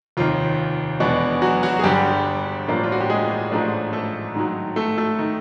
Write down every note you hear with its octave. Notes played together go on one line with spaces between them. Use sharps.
F1 D#2 D#3 F4
E2 B2 G#3 B3 D4
F#3 F#4
F#3 F#4
G#4
G1 G2 D3 G3 G4
A1 A2 F3 A#3 D4
F4
F#4
G4
G#3 G#4
A1 G#2 F3 A3 D4
A3 A4
G#2 D#3 F#3
A3 A4
A3 A4
D#3